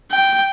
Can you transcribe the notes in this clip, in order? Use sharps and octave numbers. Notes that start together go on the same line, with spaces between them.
G5